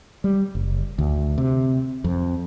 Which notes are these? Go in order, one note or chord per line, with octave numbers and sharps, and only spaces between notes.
G3
F#1
D2
C3
F2